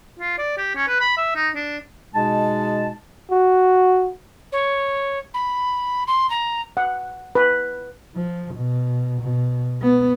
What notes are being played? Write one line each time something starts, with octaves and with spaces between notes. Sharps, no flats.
F4
D5
G4
C#4
B4
B5
E5
D#4
D4
B2 G#3 D#4 G#4 A5
F#4
C#5
B5
C6
A#5
F#5
B4
F3
B2
B2
B3